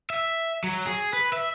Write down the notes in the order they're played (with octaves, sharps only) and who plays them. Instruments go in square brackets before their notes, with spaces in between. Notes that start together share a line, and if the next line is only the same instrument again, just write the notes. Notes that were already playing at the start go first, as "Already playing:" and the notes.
[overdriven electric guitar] E5
F#3
G#4
B4
E5